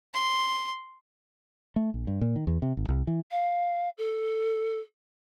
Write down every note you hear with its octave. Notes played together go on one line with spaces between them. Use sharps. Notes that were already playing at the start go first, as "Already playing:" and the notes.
C6
A3
A#1
G2
A#2
D#3
E2
C3
G#1
C2
E3
F5
A4